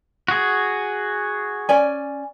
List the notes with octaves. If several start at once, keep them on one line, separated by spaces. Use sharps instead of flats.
F#4 G#4
C#4 D5 G#5